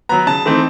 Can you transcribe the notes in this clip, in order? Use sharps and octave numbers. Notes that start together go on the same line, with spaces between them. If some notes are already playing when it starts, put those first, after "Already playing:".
F#3 B3 A#5
C#3 A5
E3 A3 C4 D#4